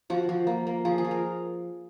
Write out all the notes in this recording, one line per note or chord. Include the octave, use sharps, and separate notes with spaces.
F3 F#4
F3
A#3
A#3
F3 G#4
G#4
F3
A#4